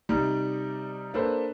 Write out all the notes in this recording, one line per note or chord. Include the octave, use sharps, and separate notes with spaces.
C3 G3 D#4 D5
A#3 D4 A4 B4 C5